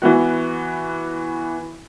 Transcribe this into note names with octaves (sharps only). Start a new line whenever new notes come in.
E3 B3 F#4